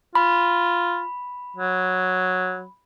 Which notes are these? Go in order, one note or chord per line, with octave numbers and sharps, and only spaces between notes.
F4 B5
F#3